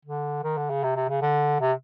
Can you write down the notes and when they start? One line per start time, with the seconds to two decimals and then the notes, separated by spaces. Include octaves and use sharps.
0.05 D3
0.44 D#3
0.57 D3
0.70 C#3
0.83 C3
0.96 C3
1.09 C#3
1.22 D3
1.61 C3